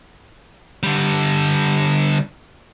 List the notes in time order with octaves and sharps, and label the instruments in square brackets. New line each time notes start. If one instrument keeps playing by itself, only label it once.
[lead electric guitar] D3 G3